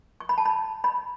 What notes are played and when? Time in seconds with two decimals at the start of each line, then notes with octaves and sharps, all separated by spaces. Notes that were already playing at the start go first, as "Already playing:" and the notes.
0.20 C#6
0.29 B5
0.38 A5
0.46 B5
0.84 B5